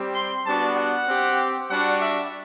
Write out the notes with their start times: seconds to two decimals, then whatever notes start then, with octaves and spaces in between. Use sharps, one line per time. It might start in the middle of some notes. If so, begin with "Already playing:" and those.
Already playing: G3 C4 G4
0.15 C6
0.45 G3 B3 D4 F#4 A5
0.76 F#5
1.07 C4 G4
1.69 G3 D4 F#4 F#5
2.00 E5